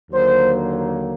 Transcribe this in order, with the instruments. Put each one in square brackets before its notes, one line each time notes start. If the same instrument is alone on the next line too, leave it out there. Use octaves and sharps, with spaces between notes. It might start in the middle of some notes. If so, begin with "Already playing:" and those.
[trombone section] D#2 D3 F#3 A#3 C5